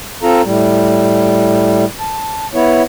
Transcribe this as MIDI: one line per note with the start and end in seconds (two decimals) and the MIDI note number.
0.23 0.42 60
0.23 0.42 65
0.23 0.42 69
0.23 0.42 82
0.44 1.85 45
0.44 1.85 55
2.00 2.47 81
2.54 2.82 59
2.54 2.82 64
2.54 2.82 73